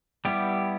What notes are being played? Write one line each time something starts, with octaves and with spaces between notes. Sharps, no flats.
G3 B3 E4 G4